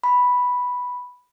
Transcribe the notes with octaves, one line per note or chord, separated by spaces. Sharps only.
B5